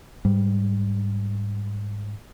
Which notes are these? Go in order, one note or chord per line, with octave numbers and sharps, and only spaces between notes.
G#2 G3